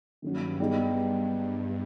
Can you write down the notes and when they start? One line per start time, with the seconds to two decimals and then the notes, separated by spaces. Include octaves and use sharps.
0.22 G2 D#3 F#3 A#3 C#4 F#4
0.59 G2 G3 B3 D#4 G#4